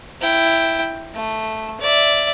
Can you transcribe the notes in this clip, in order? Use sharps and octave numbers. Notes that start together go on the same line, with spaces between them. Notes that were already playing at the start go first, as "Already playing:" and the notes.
E4 G5
A3
D5 E5